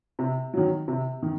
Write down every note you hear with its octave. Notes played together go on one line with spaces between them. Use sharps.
C3
D#3 F#3
C3
D#3